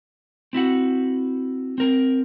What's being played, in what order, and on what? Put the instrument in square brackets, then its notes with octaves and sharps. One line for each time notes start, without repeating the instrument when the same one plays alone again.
[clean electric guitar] C4 E4 F#4 F#5
C4 A#4